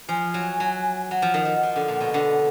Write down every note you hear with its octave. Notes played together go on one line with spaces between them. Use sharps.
F3 G#5
F#3
F#3
F#3 F#5
F3
D#3
F3
F3
D3
A#2
B2
D3